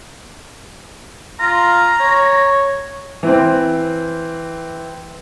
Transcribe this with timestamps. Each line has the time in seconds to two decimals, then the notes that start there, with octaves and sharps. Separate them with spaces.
1.40 F4 A#5
2.00 C#5
3.23 E3 C4